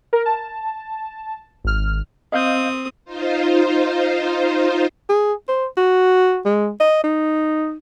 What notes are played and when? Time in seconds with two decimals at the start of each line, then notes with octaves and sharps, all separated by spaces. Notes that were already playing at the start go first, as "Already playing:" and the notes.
0.13 A#4
0.26 A5
1.64 G#1 F6
2.32 C4 D#5 F5 D#6 G6
3.05 D#4 F4 C5
5.10 G#4
5.49 C5
5.77 F#4
6.46 G#3
6.80 D#5
7.04 D#4